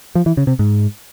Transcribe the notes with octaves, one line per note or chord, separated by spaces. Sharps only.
F3
E3
C#3
C3
G#2